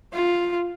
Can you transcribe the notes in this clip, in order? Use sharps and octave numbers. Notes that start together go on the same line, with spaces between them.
F4